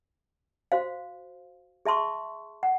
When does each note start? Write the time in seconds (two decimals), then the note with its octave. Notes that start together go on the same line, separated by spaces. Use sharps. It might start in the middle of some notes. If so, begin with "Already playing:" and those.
0.72 F#4 C5 F5
1.85 G#4 E5 A5 C6 C#6
2.63 F#5